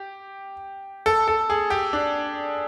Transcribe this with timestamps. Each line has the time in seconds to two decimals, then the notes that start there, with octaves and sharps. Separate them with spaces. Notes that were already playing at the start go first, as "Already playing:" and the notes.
Already playing: G4
1.06 A4
1.28 A4
1.50 G#4
1.70 G4
1.93 D4